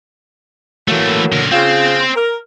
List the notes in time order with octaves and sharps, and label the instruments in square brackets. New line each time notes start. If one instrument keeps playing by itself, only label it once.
[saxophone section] A2 F#3 A#3 [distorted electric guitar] E3 A3
[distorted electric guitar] D3 A#4
[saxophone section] C#3 F4 [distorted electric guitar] C4
[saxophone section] A#4